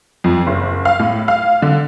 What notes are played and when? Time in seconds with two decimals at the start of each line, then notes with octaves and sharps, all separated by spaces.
0.24 F2
0.47 F#1
0.85 F5
1.00 A2
1.28 F5
1.62 D3